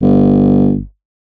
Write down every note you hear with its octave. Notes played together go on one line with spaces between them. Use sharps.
G1